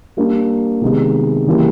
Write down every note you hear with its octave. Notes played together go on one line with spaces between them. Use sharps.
G3 A#3 D4
C3 D#3 G#3 B3 D#4
C#3 E3 G3 A#3